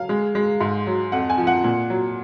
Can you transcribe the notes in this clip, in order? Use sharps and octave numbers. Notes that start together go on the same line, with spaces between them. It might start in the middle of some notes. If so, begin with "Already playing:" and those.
Already playing: F#3 F5
G#3
G#3
G#2
F#3
F2 F#5
G#5
F3
F#5
A#2
F#3